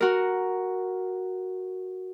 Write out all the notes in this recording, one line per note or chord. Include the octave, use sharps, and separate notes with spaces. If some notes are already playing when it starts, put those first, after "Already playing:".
F#4 A#4